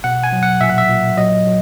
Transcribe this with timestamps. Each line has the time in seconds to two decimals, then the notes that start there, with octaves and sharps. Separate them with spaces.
0.04 B2 F#5
0.23 G#5
0.33 F#3
0.43 F#5
0.61 A#2 E5
0.69 F#5
0.78 E5
0.90 A#2
1.18 F#3 D#5
1.47 F#3